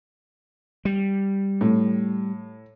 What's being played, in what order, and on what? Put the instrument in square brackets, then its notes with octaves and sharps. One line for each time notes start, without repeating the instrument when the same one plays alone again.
[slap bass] G3
[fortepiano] A2